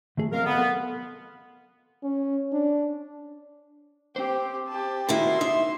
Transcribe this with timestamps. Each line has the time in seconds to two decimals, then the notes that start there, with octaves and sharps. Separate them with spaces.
0.17 D#3 A3 G#4
0.32 F#3 C4 A#4 D#5 F5
0.45 B3 A4 D#5
0.57 A4 F#5 C6
2.04 C#4
2.53 D4
4.16 C4 G4 C5
4.68 G4 A5
5.09 B2 D#3 E4 F#4 A#4 C6
5.41 D#4 E5